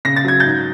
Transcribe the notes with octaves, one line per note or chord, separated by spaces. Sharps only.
C#3 A#6
A6
F#3 G#6
G#2 G6 A6